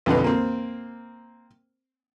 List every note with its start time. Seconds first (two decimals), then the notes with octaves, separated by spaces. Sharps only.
0.06 B1 F2 D3 B4
0.24 A#3 C4